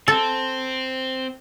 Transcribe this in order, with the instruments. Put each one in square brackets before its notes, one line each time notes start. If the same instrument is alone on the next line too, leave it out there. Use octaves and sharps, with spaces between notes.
[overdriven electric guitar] C4 [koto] A4